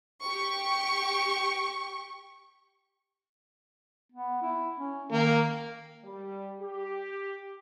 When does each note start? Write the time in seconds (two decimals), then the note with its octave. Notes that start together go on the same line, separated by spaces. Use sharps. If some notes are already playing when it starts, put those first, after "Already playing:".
0.22 G4 C#6
4.12 B3
4.42 E4
4.78 C#4
5.12 D#3 A#3
6.05 G3
6.61 G4